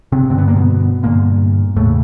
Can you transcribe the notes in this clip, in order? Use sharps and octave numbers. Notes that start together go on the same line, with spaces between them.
C3 C4
G2 D3 C4
B3
A#3
B2 B3
G2 A#2 D3 A#3
E2 A2 C#3 A3